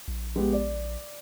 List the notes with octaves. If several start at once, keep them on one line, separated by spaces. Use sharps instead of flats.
A#1
G#3 B3 G4
D5